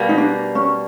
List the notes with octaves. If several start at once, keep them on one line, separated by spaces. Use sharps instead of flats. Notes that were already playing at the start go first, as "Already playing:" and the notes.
Already playing: B2 G3 A#3
D#4
D4
C#4